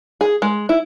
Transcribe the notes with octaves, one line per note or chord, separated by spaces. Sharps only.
G#4
G#3
E4